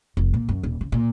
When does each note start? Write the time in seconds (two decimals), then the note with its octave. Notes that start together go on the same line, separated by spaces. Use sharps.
0.17 F1
0.34 A#2
0.49 F#2
0.63 D#1
0.81 C#3
0.92 A#2